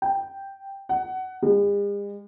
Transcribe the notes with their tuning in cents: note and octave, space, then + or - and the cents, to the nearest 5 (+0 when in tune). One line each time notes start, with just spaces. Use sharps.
G5 +0
F#5 +20
G#3 -45